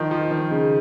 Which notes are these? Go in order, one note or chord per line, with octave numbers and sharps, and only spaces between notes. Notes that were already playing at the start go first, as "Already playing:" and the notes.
Already playing: D#3 F3
F3
D#3
C#3